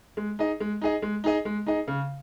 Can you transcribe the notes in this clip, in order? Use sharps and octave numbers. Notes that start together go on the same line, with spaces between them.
G#3
D#4 G#4 D#5
G#3
D#4 G#4 D#5
G#3
D#4 G#4 D#5
G#3
D#4 G#4 D#5
C#3